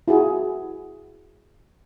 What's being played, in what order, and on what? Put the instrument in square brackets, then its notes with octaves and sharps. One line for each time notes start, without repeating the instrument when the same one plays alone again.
[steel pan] E4 F#4 G#4